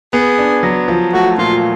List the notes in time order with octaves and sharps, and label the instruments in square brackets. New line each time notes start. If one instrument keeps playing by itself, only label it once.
[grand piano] B3 [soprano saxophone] G#4
[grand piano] D4
F#3
F3
[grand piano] A3 [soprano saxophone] F#4
[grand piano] A#2 [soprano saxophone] F4